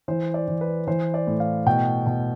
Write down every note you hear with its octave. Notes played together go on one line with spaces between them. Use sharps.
E3 C5
D5
E3
B4
E3 C5
D5
A2
F5
B2 G5
B2